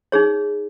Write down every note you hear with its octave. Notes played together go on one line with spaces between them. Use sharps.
D#4 G#4 C#5